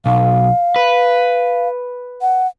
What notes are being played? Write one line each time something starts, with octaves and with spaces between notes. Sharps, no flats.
B1 F5
B4
F#5